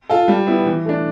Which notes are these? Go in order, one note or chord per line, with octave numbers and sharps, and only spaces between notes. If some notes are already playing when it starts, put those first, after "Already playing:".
F4 A4
G3
B3 E4
E3
A3 D4